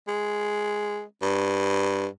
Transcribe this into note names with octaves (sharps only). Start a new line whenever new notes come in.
G#3
G2